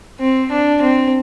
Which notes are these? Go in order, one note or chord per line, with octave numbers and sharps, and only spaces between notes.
C4
D4
C4